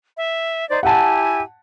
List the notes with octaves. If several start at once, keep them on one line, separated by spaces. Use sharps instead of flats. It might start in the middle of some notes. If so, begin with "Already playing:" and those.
E5
D#4 C5 D5
E4 G4 F#5 G#5 A5